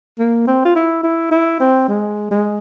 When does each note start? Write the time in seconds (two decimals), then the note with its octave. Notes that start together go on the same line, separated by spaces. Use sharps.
0.19 A#3
0.47 C4
0.65 F4
0.75 E4
1.03 E4
1.31 E4
1.60 C4
1.88 G#3
2.31 G#3